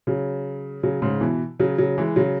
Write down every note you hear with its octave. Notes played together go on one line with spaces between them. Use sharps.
C#3 F#3
C#3 F#3
G#2 C#3
B2 E3
C#3 F#3
C#3 F#3
E3 G#3
C#3 F#3